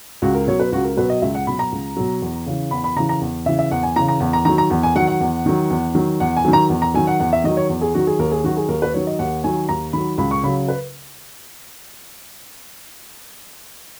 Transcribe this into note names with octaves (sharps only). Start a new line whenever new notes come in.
C#2 F#4
A#4
B2 F#3 C#5
B4
C#2 F#4
A#4
B2 F#3 B4
D#5
C#2 E5
F#5
B2 F#3 B5
A#5
C#2
B2 F#3
E2
C#3 E3
E2 B5
B5
C#3 E3 A#5
A#5
E2
C#3 E3 E5
E5
E2 F#5
G#5
C#3 E3 A#5
A#5
E2
A#5
D#3 F#3 A#5
A#5
E2
G#5
D#3 F#3 F#5
F#5
E2
D#3 F#3
E2
D#3 F#3
E2 F#5
G#5
D#3 F#3
A#5
E2
A#5
D#3 F#3 G#5
F#5
E2 F#5
E5
D#3 F#3 D#5
C#5
E2
G#4
D#3 F#3 F#4
G#4
D#2 A#4
G#4
D#3 F#3 F#4
G#4
D#2 A#4
B4
D#3 F#3 C#5
D#5
D#2 F#5
D#3 F#3 G#5
D#2 A#5
D#3 F#3 B5
C#2 B5
C#6
C#3 F#3 B5
B4